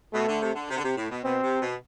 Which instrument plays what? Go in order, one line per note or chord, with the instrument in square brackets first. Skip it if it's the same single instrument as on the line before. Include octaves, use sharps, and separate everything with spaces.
[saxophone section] B2 [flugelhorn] A3
[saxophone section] D3
C3
D3
C3
D3
C3
A2
B2
[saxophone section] B2 [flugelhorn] C4
[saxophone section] C3
B2